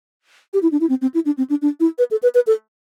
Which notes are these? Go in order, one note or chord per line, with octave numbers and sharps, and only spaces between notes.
G4
E4
D4
E4
C4
C4
E4
D4
C4
D4
D4
E4
B4
A4
B4
B4
A4